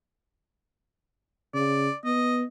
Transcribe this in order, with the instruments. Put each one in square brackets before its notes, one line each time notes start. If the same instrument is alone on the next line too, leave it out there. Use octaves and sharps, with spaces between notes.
[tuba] C#3 [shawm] D5
[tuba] B3 [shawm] D#5